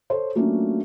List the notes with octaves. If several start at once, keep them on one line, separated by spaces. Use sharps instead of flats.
A4 C5 C#5
F#3 A3 A#3 C#4 D4 F4